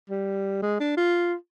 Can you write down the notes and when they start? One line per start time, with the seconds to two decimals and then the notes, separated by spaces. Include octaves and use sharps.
0.10 G3
0.62 G#3
0.80 D4
0.97 F4